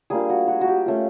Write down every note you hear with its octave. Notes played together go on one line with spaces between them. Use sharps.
G3 A#3 D4 F4 G#4
F#4
F#4
F#4
G4
A3 C#4 F4